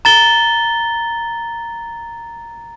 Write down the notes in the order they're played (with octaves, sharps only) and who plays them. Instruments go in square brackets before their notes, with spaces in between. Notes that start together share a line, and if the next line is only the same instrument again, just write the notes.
[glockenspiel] A#5 A6 G7